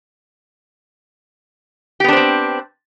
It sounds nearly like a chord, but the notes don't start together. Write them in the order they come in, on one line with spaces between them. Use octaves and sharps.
G4 B3 D4 C5 C4